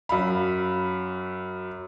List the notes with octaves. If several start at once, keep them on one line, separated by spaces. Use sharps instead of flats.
F#2 F5 B5